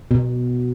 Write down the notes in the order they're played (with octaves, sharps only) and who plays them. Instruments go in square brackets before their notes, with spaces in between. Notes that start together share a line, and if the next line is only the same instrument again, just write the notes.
[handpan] B2